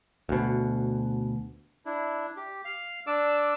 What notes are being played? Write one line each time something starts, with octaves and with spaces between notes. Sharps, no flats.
D2 B2
D4 E4
G4
F5
D4 D5 D6 E6